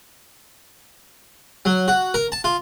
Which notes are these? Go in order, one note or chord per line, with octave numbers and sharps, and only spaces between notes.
F#3
F#4
A#4
A5
F4